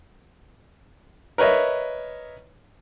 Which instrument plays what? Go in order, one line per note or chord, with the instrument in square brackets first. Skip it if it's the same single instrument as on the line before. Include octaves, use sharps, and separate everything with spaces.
[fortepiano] A#4 B4 C#5 D#5 E5